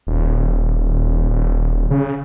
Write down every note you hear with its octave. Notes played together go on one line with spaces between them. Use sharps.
D#1
D#1
C#3